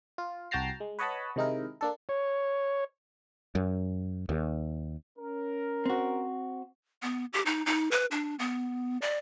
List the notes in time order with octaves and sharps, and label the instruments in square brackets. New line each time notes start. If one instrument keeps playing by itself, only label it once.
[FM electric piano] F4
C2 F#4 G5 A5 A#5 C7
G#3
B4 C#5 D#5 F#5 A5 B5
C3 D#3 G#3 D#4 E4 A#4
A#3 D4 A4
[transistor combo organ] C#5
[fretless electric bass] F#2
D#2
[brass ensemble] C#4 A#4
[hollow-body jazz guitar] C4 F#4
[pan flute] B3
G4
D#4
D#4
B4
D4
B3
D5